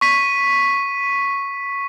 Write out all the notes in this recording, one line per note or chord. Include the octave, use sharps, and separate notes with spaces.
C#6 B6 D#7